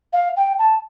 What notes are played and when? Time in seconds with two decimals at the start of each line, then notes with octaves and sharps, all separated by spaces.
0.13 F5
0.37 G5
0.59 A5